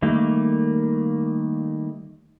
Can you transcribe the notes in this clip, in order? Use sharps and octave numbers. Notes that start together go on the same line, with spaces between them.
D#3 G3 A3 A#3